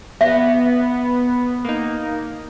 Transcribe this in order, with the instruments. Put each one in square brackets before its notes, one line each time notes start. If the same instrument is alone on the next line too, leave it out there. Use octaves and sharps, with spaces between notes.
[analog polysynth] B3 [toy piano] E5
[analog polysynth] A#3 D#4